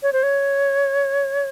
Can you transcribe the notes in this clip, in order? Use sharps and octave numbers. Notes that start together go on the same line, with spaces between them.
C#5
C5
C#5